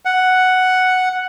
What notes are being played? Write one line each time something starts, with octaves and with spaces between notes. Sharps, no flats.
F#5